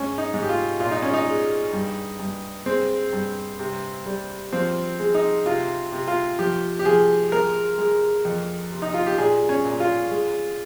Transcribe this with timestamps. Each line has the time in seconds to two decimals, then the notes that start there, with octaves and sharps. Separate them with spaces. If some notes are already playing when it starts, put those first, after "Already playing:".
Already playing: G#2 C#4
0.18 D#4
0.34 G#2
0.42 G4
0.49 F4
0.80 A#2 F4
0.91 D#4
1.02 C#4
1.13 D#4
1.26 G#3
1.73 G2
2.20 G2
2.66 G#3 C4
3.13 G2
3.59 C3
4.06 G3
4.53 F3 C4
5.00 G#3
5.14 D#4
5.46 C3 F4
5.92 C3
6.08 F4
6.39 F3 G4
6.79 G4
6.85 F3 G#4
7.32 G#3 A#4
7.78 G#3
8.25 F2
8.72 C3
8.82 D#4
8.94 F4
9.06 G4
9.18 A#2 G#4
9.49 C#4
9.65 A#2
9.80 F4
10.11 G#3